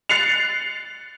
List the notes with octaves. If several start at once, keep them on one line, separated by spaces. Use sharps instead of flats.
F#6 A6 C7 C#7 F7